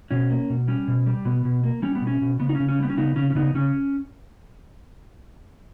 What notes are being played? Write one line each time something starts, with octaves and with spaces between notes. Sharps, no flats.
B2 C#4
A#3
B2
G3 C#4
B2
G3
B2 B3
B2
A#3
G3 C#4
B3
B2
C#4
B2
C#3 B3
D#4
C#4
C#3
C#4
G3 B3
C#4
C#3 B3 D#4
C#3 C#4
C#4
C#3 B3 D#4
C#3 C#4